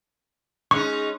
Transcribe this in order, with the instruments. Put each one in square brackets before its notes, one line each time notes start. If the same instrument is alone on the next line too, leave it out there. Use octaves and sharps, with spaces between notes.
[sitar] G#3 C#4 D#4 [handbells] C#6